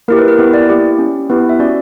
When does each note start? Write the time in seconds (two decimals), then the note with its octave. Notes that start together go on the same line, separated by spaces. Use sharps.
0.08 A#3 E4 G4 A#4
0.19 B4
0.28 A#4
0.38 B3 E4 G4 B4
0.54 D5
0.69 A#3 E4 G4
0.99 C#4 G4
1.29 B3 E4 G4 B4
1.49 E5
1.59 C#4 F#4 D5